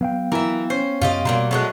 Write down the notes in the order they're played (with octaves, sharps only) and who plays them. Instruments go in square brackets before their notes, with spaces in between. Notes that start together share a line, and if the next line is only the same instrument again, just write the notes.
[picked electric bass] F#3 [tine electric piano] B3 F5 G5
[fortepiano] E3 [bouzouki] A#4 E5
[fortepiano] C#4 [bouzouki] C5
[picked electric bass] F#2 C3 [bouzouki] F4 G4 D#5
[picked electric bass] B2 [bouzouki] F#3 G3 A#3 [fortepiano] C6
[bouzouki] A2 G#3 B3 [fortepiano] F#3 C#6 F#6